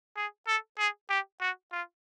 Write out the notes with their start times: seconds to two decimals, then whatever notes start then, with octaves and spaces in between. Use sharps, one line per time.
0.16 G#4
0.47 A4
0.78 G#4
1.10 G4
1.41 F#4
1.72 F4